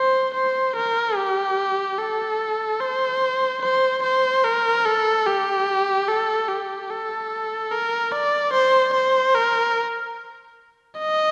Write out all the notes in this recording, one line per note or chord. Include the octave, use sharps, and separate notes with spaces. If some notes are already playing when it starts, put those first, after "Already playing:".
Already playing: C5
C5
A#4
G4
A4
C5
C5
C5
A#4
A4
G4
A4
G4
A4
A#4
D5
C5
C5
A#4
D#5